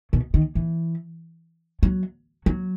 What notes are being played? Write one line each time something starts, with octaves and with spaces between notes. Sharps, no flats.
B2
D#3
E3
F#3
F#3